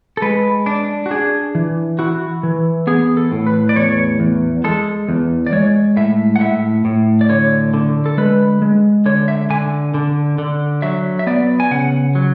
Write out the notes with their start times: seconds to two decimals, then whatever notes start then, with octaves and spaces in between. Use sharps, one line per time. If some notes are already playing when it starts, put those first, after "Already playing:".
0.17 A4
0.22 G#3 B4
0.66 D4
1.06 F#4
1.11 D4 G#4
1.55 E3
1.99 E4 F#4
2.43 E3
2.87 B3 G#4
3.17 A4
3.32 A2
3.47 B4
3.69 D5
3.76 E2 C#5
4.20 E2
4.64 G#3 A4
5.09 E2
5.46 D5
5.52 G#3 C#5
5.97 A2 E5
6.36 F#5
6.41 A2 E5
6.85 A2
7.21 D5
7.29 D3 C#5
7.74 D3
8.06 A4
8.17 G#3 B4
8.62 G#3
9.06 D3 C#5
9.28 E5
9.50 D3 G#5
9.94 D3
10.38 D3
10.82 F#3 E5
11.19 E5
11.27 B3 D5
11.60 G#5
11.71 C#3 F#5
12.15 F#3